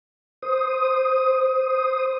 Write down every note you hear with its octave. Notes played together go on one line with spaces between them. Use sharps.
C5 D#6